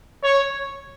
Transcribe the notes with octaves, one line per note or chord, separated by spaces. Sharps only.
C#5